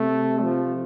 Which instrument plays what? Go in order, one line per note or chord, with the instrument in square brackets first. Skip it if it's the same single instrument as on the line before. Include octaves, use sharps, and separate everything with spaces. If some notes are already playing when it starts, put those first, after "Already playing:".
Already playing: [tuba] C3 [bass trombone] A3
[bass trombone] F3